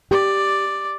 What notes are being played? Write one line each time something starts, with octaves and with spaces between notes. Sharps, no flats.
G4 D5